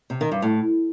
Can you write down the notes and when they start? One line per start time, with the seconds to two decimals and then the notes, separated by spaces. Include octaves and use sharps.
0.10 C3
0.21 D#3
0.32 G2
0.42 A2